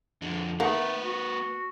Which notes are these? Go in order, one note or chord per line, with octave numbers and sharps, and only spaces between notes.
F2 D3
D#3 A3 A#3 A#4 B4 F#5
F#4